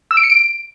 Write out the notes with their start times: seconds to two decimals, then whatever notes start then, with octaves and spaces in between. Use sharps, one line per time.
0.11 E6
0.17 D7
0.23 C#7
0.30 D7